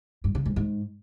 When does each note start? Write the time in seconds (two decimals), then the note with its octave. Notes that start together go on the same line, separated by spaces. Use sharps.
0.24 G2
0.35 C#3
0.46 G#2
0.56 G#2